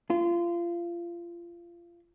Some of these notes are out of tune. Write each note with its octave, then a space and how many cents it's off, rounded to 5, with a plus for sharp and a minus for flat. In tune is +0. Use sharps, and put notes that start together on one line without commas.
F4 -25